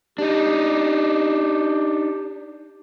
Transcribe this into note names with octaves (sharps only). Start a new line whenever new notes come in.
D4 D#4 G4